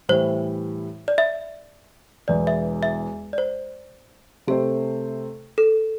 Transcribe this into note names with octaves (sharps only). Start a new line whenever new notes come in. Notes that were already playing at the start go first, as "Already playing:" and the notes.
A2 E3 G3 E4 C5
D5
E5
E1 E2 E3 D5
E5
E5
D5
C5
C3 A3 C4 G4 A4 C5
A4